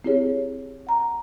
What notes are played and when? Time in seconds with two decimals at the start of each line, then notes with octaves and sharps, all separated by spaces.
0.04 C4 E4 G4 G#4 C#5
0.87 F#5 A#5